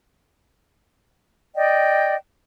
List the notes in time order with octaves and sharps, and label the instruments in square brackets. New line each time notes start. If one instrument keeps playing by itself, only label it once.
[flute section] D5 D#5 G5